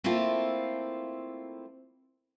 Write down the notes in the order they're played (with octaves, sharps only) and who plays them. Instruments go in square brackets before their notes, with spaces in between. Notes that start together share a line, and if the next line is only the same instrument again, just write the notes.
[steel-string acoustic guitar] A3 A#3 C4 E4 F4 A4